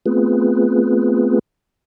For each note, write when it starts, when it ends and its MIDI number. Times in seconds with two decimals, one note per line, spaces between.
0.06 1.39 57
0.06 1.39 59
0.06 1.39 60
0.06 1.39 65
0.06 1.39 68
0.06 1.39 71